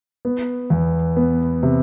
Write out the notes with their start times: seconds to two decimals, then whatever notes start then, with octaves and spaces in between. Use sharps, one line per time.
0.25 B3
0.70 E2
1.16 B3
1.63 C3